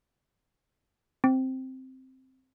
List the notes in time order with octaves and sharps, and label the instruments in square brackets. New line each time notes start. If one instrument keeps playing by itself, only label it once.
[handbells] C4